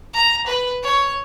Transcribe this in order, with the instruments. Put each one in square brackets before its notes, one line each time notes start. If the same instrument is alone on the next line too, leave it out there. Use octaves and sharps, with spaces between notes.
[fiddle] A#5
B4
C#5